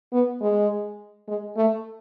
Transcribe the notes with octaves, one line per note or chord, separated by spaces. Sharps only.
B3
G#3
G#3
A3